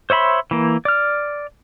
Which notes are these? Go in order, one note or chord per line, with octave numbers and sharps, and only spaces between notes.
C5 C#5 E5 B5 C6
E3 A#3
D5 F6